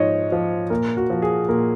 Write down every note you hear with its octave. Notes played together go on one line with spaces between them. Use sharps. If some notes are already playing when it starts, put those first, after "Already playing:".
Already playing: G#2 F3 C#5 D#5
F3
A#2 A#4
F#4
F3
G#4
A#2 A#4